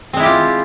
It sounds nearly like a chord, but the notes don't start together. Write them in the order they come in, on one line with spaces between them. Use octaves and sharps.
C4 G#3 E4 G4 F4